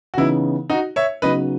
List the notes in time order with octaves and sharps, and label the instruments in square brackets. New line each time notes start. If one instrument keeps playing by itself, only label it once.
[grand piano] F#4
[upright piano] C#3 E3 B3 D#4 [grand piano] E4
[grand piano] D#4 F#4
C#5 E5
[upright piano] C#3 F#3 B3 D#4 [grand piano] B4 D#5